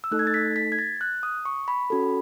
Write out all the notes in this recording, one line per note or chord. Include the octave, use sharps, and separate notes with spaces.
E6
A3 D#4 A4 F#6
G#6
A6
B6
B6
G#6
A6
F#6
D#6
C#6
B5
C#4 F#4 A4